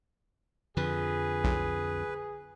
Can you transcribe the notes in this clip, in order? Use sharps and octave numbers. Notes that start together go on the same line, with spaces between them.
F2 D3 F3 G#4 B4
B1